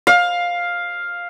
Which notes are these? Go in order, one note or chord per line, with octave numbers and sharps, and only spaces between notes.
F5